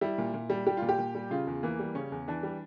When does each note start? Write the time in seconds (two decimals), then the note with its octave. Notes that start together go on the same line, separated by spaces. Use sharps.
0.01 G3 E4
0.18 A#2
0.34 A#2
0.50 G3
0.67 G3 G4
0.77 F4
0.82 A#2
0.89 G4
0.98 A#2
1.15 G3
1.31 C#3 F4
1.47 E2
1.63 E3 A#3
1.79 G3
1.95 C#3 C#4
2.12 E2
2.28 E3 D4
2.43 G3